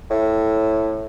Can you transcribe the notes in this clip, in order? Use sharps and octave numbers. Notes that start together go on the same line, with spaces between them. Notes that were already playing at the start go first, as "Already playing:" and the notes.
A2